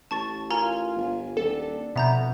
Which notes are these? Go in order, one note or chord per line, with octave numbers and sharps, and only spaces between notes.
A1 A5 C#6 A6
F4 A#4 G#5 A#5
G1
D#1 D4 A4
F2 B2 E5 A#5 G6